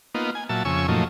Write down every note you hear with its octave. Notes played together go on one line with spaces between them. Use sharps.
A#3 B3 D#4 F4
G#5
A#2 F#3 E5 A5
F2 C#3 G#5 C#6 E6
F#2 A#2 F3 A3 D#4